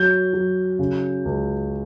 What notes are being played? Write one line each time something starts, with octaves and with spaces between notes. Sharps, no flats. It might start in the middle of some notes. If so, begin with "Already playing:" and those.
Already playing: F#3 G6
F#3
C#3
C#2